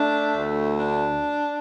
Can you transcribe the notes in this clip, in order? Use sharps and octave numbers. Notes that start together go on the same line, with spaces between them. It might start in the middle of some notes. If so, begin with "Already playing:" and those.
Already playing: A3 D4
D2
D4